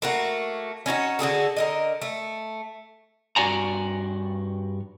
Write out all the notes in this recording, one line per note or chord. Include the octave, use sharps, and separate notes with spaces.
A3 A#3 F#4
C#4 D#4 F#4 C#5
D3 F#4 G#4 A4
D3 A#4 D#5
A3
G2 F#4 D5 G#5 A#5